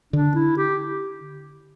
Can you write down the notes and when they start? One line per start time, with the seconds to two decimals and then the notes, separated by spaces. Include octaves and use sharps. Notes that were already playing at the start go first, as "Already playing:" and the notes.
0.13 D3 D4
0.35 E4
0.57 G4